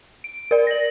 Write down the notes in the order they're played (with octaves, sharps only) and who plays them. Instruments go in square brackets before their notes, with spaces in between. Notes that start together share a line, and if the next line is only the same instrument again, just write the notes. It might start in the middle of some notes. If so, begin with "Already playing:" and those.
[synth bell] D7
A#4 D5
A#6 F#7